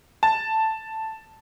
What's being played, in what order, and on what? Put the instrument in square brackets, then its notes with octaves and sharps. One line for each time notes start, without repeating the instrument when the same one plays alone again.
[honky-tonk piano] A5